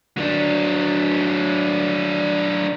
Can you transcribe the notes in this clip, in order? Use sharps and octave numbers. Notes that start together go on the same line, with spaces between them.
F#3 D4